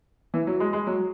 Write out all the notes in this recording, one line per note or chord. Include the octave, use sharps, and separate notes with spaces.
E3
F#3
G#3
G#3
F#3